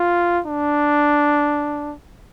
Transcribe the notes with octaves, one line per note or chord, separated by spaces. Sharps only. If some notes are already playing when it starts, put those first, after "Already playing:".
Already playing: F4
D4